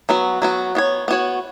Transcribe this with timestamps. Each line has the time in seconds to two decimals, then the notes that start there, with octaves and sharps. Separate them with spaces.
0.09 F#3 B3 F#4
0.42 F#3 B3 F#4
0.75 B3 F#4 C#5
1.08 B3 F#4 C#5